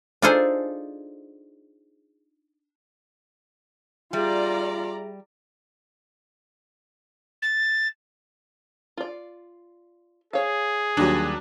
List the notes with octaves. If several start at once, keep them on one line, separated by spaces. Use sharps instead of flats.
D4 D#4 F4 G#4 A4 C5
G3 F4 G#4 D5 E5 A#5
A6
F4 D5
G#4 C#5 F5
D#2 F#3 G3 D4